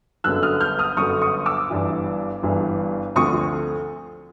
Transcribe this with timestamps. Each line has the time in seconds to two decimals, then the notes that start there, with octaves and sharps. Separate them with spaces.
0.24 G1 F#2 D3 E6 F#6
0.43 D#6 F6
0.61 F6 G6
0.79 D#6 F6
0.97 G1 F#2 D3 C#6 D#6
1.21 C#6 D#6
1.46 D6 E6
1.70 G1 G2 E3
2.43 G1 G2 E3
3.16 D2 D3 F3 A3 C4 C#6 D#6